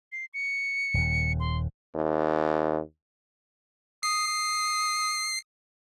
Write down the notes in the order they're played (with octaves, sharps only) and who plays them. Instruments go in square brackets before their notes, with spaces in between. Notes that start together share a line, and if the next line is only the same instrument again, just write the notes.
[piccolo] C7
C#7
[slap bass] D#1 D#2
[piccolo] C6
[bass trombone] D#2
[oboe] D#6 [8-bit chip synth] C7
[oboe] D#6